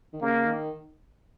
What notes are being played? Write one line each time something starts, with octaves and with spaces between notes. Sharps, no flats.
D#3
C#3 A#3
D#3